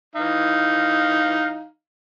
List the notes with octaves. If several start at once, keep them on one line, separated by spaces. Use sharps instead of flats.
E3 D#4 F5